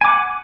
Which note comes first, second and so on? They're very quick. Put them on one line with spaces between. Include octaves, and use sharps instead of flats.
G#5 D6 F#5